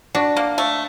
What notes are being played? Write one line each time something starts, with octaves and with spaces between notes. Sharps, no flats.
D4 F#4
A#3
A3